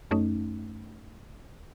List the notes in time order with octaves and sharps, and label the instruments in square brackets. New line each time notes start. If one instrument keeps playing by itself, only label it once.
[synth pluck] F#2 A3 C#4 D#4